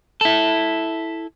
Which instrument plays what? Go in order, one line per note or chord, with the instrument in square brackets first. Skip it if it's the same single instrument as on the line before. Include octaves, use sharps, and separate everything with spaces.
[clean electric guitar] E4 A4